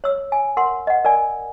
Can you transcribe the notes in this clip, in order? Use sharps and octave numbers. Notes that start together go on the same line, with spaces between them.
C#5 E6
G#5
A#4 F#5 C6
D#5 F#5
A#4 D5 G#5